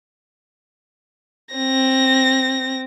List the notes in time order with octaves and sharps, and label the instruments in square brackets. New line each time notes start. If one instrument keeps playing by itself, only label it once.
[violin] C4 A#6